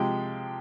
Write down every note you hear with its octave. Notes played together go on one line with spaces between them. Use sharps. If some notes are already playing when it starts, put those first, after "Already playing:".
Already playing: C3 F3 G#3 G4 G5